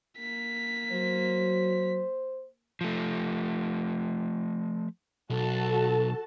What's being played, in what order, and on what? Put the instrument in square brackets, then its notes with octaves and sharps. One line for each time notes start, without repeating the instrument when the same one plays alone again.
[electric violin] A#3 B6
[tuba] F#3 [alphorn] C5
[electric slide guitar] F3 A3
[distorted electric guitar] B1 [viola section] F#4 A4 A5